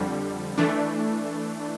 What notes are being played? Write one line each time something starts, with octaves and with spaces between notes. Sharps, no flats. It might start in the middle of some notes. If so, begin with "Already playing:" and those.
Already playing: F2 D3 G3
E3 A3 D4